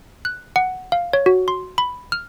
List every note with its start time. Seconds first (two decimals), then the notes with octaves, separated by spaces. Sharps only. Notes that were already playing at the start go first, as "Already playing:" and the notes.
0.25 F#6
0.56 F#5
0.92 F5
1.13 C#5
1.26 F#4
1.48 C6
1.78 B5
2.12 F6